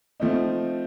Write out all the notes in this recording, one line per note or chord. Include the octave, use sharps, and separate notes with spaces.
F3 A3 C4 D#4